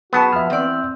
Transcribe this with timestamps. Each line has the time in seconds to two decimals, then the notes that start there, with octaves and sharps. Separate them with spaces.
0.13 F#2 B3 F#4 G#4 A5
0.33 F3 E5 F6
0.50 E2 C4 D5